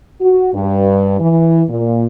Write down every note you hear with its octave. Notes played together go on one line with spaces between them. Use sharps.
F#4
G2
E3
A#2